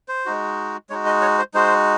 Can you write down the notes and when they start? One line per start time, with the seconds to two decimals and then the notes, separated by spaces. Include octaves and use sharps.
0.08 C5
0.26 G#3 D#4 F#4
0.90 G#3 D#4 F#4 C#5
1.06 D#5
1.22 C#5
1.39 C5
1.54 G#3 D#4 F#4 C5